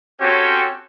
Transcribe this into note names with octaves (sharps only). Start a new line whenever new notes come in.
C4 C#4 F#4 G4 A4 C#5